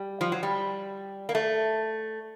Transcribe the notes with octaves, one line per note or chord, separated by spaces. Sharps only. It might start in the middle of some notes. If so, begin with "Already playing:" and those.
Already playing: G3
F3
F#3
G3
A#3
A3